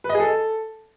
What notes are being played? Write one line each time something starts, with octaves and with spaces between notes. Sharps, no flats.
B4
D#5
G#4
A4